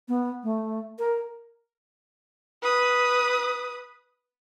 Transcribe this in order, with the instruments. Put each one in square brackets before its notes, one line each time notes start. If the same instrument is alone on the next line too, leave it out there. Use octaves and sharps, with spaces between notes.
[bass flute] B3
A3
A#4
[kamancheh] B4 D#6